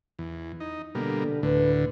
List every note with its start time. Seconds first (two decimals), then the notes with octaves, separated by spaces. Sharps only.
0.19 E2
0.60 D#4
0.95 B2 D3 G3 A#3
1.43 D2 A2 D3 B4